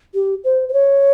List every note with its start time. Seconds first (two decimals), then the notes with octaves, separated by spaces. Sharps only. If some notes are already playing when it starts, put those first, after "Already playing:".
0.14 G4
0.44 C5
0.69 C5
0.73 C#5